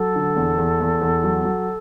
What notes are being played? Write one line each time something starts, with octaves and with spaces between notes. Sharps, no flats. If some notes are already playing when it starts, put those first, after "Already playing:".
Already playing: F#3 A4
D3
E2
E2
E2
E2
F#3
F#3